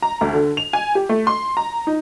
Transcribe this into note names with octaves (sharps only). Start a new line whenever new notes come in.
A#5
D2
D3
F7
G#5
G4
A3
C6
A#5
D#4